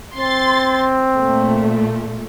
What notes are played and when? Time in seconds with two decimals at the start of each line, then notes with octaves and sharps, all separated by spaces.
0.16 C4 C6 A6
1.15 A#2 A3